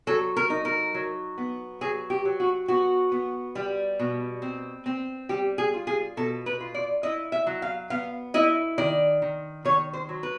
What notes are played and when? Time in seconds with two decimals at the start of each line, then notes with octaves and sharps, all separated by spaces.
0.07 F#3 A4
0.37 A#4
0.50 D#4
0.65 A#4
0.94 F#3
1.38 B3
1.81 F#3 G#4
2.10 G4
2.25 F#3
2.40 F#4
2.68 B3 F#4
3.12 B3
3.55 G3
3.99 B2
4.42 C4
4.86 C4
5.29 G3 G4
5.58 G#4
5.74 F4
5.87 G#4
6.17 B2 A4
6.46 B4
6.60 F4
6.74 D5
7.03 E4 D#5
7.32 E5
7.47 F#3
7.62 F5
7.90 B3 F5
8.34 E4 D#5
8.78 D#3 D5
9.22 D#3
9.65 D#3 C#5
9.93 C5
10.09 F#3
10.23 B4